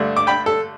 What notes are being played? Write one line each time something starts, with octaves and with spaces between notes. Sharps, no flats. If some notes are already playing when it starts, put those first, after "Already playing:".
Already playing: G2 D3 A3 D4
D6
G5 B5
A4